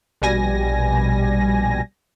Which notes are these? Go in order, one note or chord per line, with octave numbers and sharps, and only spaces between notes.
A#1 B2 G3 G#5 A#6